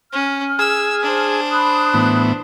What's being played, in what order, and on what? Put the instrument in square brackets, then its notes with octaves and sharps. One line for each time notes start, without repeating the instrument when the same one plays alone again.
[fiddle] C#4 [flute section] F6
[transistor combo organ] G#4 G#5 [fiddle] E6
[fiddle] D4 C5
[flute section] B5 D#6 F#6
[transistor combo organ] A2 E3 B3